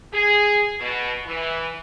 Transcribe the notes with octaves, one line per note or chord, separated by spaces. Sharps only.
G#4
B2
E3